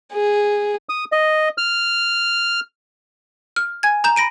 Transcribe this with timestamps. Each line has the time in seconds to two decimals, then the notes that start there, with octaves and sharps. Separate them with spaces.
0.13 G#4
0.89 D#6
1.12 D#5
1.58 F6
3.56 F6
3.83 G#5 G#6
4.04 A#5 G6 E7
4.16 B5 A#6 D7 D#7